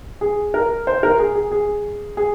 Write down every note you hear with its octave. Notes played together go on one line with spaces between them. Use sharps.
G#4
A#4
C5
A#4
G#4
G#4
G#4
G#4